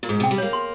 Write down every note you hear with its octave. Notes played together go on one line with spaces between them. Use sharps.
A#2
G#2 G#4
C3 G5
G3
A#3 C#5
C6